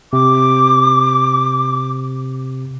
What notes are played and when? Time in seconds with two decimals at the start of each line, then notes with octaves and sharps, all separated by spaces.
0.13 C3 D6